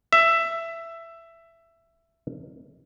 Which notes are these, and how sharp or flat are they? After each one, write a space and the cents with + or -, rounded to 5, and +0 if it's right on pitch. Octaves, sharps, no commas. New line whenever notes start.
E5 +15